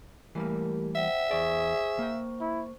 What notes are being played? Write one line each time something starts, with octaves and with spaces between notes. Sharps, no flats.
E3 G3 A3 A#3 G4 A#4
C5 E5 F#5 G5
E2 G#4 C5 D5 C#6
A#3 G5
E4